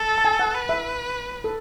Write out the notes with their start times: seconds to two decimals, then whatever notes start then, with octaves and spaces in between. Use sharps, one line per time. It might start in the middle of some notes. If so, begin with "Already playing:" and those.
Already playing: A4
0.18 A5
0.25 G#5
0.39 F#5
0.54 B4
0.69 E5
1.44 A4